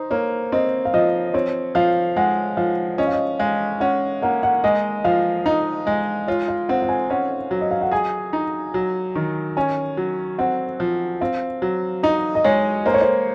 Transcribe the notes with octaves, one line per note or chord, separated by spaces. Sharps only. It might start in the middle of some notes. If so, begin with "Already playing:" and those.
Already playing: D#4 C5
A#3 C#5
C4 D#5
F5
F3 D#5
C4 C#5
F3 F5
G#3 F#5
F3 F5
C#4 D#5
F5
D#5
G#3 F5
C#4 F#5
A#3 F#5
F#5
G#3 D#5
F3 F5
D#4 D#5
G#3 D#5
F4 C#5
F5
C4 F#5
F#5
G#5
C#4 F#5
F#3
D#5
F5
F#5
G#4 G#5
D#4
F#3
D#3
C#4 G#5
F#3
C4 F#5
F3
C4 F5
F#3
D#4 D#5
D#5
G#3 C#5
A#3 C5
C#5
C5